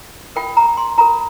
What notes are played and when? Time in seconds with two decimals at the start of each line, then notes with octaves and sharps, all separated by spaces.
0.36 F4 A#4 G5
0.57 A#5
0.77 C6
0.97 F4 A#4 A#5